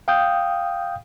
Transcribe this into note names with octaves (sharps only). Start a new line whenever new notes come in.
F5 G5 D#6 G6